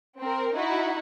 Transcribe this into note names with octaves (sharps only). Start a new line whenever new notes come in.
C4 A#4
D#4 E4 F#4